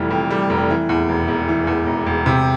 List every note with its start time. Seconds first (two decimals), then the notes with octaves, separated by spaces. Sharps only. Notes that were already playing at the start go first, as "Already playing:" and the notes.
Already playing: F1 F2 E3 G3
0.10 F2
0.31 G3
0.50 F1
0.70 E3
0.89 E2
1.09 E1
1.28 E1
1.48 E3
1.67 E2
1.86 E1
2.06 E1
2.26 C3